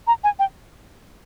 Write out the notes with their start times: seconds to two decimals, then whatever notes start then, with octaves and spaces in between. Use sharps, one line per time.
0.07 A#5
0.24 G#5
0.39 G5